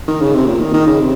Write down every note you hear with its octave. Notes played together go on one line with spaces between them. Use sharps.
D#3
C#3
C3
A#2
D#3
D#3
C#3
C3